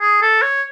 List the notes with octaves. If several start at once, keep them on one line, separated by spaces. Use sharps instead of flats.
G#4
A4
C#5